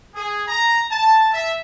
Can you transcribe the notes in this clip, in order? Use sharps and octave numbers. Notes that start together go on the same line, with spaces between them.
G#4
A#5
A5
E5